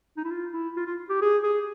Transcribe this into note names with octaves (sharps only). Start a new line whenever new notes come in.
D#4
E4
F4
E4
F4
F4
G4
G#4
G#4